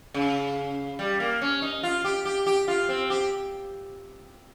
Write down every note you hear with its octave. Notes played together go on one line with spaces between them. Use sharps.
C#3
G3
A#3
C#4
D#4
F4
G4
G4
G4
F4
C4
G4